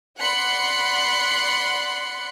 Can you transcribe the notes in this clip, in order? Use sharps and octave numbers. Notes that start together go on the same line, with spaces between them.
D5 F#5 B5 C6 F#6 C#7